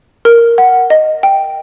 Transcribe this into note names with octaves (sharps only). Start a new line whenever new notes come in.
A#4
F#5
D#5
G5